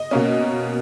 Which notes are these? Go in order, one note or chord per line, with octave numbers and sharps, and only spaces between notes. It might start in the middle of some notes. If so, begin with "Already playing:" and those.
Already playing: D#5
B2 A#3 C#4